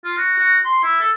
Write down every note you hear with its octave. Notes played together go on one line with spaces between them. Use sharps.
F4
F#4
F#4
C6
E4
A4